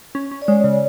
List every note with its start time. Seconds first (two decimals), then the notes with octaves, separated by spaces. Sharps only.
0.15 C#4
0.31 C#4
0.42 D5
0.48 G#3 C#5
0.64 C#3